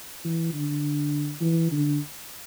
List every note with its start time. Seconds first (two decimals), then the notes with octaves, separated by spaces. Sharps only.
0.25 E3
0.54 D3
1.41 E3
1.72 D3